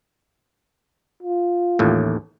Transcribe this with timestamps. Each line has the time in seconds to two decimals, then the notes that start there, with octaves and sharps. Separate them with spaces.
1.23 F4
1.79 A1 D#2 A2